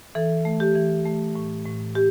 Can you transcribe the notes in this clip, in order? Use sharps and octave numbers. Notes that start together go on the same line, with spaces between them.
E3 A4
A3
G4
E3
A3
A2
A2
G4